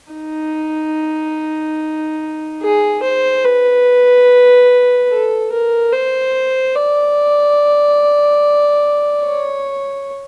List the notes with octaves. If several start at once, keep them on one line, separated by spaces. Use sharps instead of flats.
D#4
G#4
C5
B4
A4
A#4
C5
D5
C#5